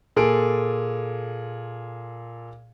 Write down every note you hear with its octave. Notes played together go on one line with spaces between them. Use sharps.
A#2 G#4 A4 D7